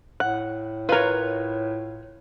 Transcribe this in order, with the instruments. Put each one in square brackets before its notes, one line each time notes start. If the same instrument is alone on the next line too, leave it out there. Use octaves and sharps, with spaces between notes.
[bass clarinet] A2 [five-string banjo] F#5
[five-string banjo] F4 A#4 [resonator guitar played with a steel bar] B4 C#5